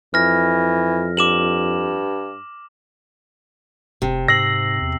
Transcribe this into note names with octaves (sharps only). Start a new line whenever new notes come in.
F2 E3 F6 A#6
G2 D6 E7 F#7
F1 C3
G#2 E6 A#6 C7 F#7
E2